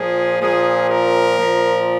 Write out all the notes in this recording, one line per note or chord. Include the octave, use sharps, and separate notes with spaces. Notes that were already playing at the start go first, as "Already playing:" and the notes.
Already playing: A#2 F3 G#4
A#2 F3 G#4
A#4
A#2 F3